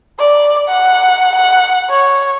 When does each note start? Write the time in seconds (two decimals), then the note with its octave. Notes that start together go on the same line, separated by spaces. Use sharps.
0.18 D5
0.69 F#5
1.35 F#5
1.90 C#5